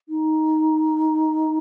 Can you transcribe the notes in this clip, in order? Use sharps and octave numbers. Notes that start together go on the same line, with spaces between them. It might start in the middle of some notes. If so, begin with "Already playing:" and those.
D#4